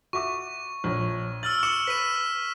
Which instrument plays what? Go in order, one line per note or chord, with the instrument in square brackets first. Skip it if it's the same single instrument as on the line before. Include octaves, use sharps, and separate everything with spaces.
[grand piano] F#4 E5 D6 [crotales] C#6
[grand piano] A#1 C#5
[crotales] E6 F6 F#7 [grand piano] A6
[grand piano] D6 C#7 [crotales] E7
[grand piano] B4 [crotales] B6 D#7